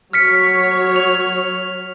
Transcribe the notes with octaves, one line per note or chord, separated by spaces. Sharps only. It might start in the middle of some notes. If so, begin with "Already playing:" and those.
F#3 C#5 F6 B6 C#7
F7